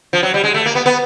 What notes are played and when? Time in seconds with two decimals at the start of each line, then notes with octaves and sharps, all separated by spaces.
0.13 F3
0.23 F#3
0.34 G3
0.44 G#3
0.54 A3
0.66 A#3
0.75 B3
0.86 B3